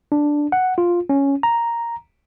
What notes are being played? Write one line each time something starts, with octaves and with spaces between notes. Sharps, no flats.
D4
F#5
F4
C#4
A#5